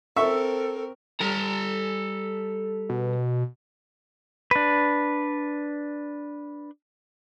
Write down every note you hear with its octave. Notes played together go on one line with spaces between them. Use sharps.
C4 A4 A#4 E5 C#6
G3 A4 A#5
B2
D4 B4